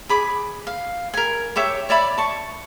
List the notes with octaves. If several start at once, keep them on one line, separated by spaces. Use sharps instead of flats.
G#4 B5 D6
F5
A#4 G#5
G4 C#5 E5 D6
C#5 D5 E5 B5
A5 C#6